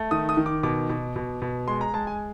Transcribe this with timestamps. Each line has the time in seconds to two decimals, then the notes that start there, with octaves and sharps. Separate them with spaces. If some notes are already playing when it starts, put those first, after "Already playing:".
Already playing: A3
0.11 D#3 D#6
0.29 D#6
0.37 D#3
0.46 D6
0.63 B2 D6
0.89 B2
1.16 B2
1.42 B2
1.68 G#3 C6
1.81 A#5
1.94 G#3 A5
2.07 G#5